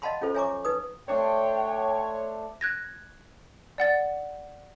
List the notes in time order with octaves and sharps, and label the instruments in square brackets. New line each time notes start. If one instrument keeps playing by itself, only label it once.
[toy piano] D#5 F5 F#5 A5 B5 C6
C#4 F4 A4 C5
C#5 E5 G#5 A#5 C#6 D6
D#4 B4 D#6
[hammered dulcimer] A3 D4 C5 [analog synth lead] C#5 [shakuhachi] G5
[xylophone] F#6 G#6 A#6
D5 F#5 A6